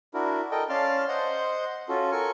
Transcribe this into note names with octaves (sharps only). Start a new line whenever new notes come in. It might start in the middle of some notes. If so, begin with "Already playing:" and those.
D4 E4 F#4 A#4
A4 A#4 D#5 G5
C#4 D5 F5 A5 C6 F6
C5 D#5 F#5 C6 G6
C#4 F4 F#4 A4
A4 A#4 G#5 C#6